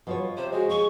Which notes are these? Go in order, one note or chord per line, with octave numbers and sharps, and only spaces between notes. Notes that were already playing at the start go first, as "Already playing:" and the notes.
B2 F3 F4 C#5
C3 C5
G#3 F#4
G#4 C#6